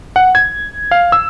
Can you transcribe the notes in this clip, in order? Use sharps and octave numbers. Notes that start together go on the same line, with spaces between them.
F#5
G#6
F5
E6